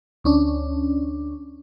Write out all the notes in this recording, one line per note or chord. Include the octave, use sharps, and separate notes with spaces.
D2 C#4 D4